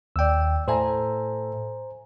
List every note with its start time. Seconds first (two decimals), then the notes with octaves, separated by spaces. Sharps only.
0.16 D#2 D5 G5 E6
0.68 A2 A4 C5 E5 G#5 A#5